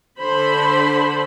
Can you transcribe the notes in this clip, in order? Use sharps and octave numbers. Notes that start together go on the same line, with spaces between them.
D3 C5 B5